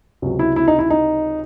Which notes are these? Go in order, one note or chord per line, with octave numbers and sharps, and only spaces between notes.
C#2 C3 F#3
E4
E4
D#4
E4
D#4